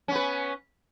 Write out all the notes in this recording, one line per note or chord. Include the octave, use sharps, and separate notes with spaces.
B3 C#4 B4